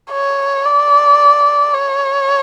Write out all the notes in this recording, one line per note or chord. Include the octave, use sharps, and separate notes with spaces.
C#5
D5
C#5